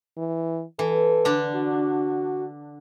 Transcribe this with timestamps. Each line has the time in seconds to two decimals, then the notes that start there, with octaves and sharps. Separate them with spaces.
0.17 E3
0.79 E3 A4
1.25 D3 D4
1.55 F#4